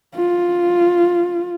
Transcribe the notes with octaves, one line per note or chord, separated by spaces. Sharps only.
F4